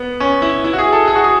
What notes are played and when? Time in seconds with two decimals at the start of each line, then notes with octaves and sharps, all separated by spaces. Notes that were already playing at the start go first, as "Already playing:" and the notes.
Already playing: B3
0.20 C#4
0.42 E4
0.64 E4
0.73 F#4
0.78 G#4
0.92 A4
1.08 G#4
1.15 F#4
1.24 G#4